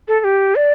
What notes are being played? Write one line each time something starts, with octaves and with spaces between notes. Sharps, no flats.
A4
A4
G4
D5